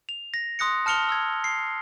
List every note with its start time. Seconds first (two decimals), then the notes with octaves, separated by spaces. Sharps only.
0.09 F7
0.34 A#6
0.59 C6 D#6 F#6 A#6 C#7
0.86 A5 F6 C#7 F7 G7
1.09 E6 G#6
1.44 C7